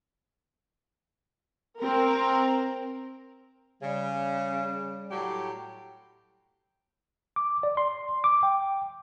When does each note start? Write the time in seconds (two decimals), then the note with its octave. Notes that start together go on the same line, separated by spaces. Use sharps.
1.80 C4 A#4
3.82 C#3 G3
5.11 A2 F#3 G4
7.36 D6
7.63 D5
7.77 C6
8.24 D6
8.43 G5